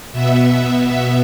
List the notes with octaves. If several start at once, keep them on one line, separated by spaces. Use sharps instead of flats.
B2 B3 E5
E5
E5